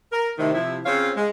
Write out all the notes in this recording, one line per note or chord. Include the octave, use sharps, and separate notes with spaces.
A#4
A2 C3 D#3
C3 F3 E4
C#3 C4 C#4 F4 C#5 F5
G#3